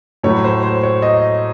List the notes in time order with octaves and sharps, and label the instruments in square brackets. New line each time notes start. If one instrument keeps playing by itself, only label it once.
[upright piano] A2 F#3 A3 C#5
C5
C5
C#5
D#5